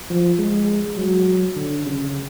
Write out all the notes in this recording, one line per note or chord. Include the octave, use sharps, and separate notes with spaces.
F3
G#3
F#3
D3
C#3